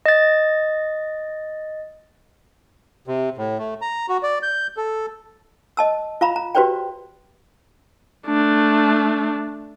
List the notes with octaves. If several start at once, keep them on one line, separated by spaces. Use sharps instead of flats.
D#5 A6
C3
A2
A3
A#5
F#4
D5
G6
A4
D#5 A5 E6
F4 F5 A#5 B5
A#5
F#4 G4 B4 C5 D5 G5
A3 D4